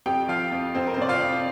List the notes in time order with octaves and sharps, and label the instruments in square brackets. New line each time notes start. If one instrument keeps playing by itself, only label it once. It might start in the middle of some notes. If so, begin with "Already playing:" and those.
[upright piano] F2 G4 G5
F3 F4 F5
F2
F2 C4 C5
A#4
C5
C3 D5
F4 F5
F2